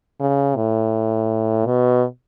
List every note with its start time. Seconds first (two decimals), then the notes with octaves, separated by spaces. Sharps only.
0.20 C#3
0.56 A2
1.66 B2